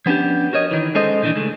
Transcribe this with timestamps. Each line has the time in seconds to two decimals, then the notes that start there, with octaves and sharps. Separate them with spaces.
0.06 F3 B3 C#4 D4 G4
0.53 F#4 A#4 C#5 D#5
0.71 D#3 E3
0.95 G#3 C#4 A4 C5 D#5
1.22 A#2 D#3 E3 D4 D#4
1.35 C#2 G#3 A3